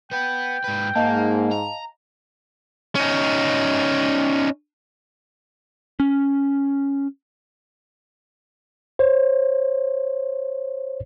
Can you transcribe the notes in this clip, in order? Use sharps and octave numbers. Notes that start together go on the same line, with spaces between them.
B3 F#5 G5
G#2 B4
G#2 A#3 D#5 F5 A5
A#5
C#4 D#4
C#4
C5 C#5